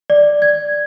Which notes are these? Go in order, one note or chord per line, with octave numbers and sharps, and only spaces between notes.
D5
G#6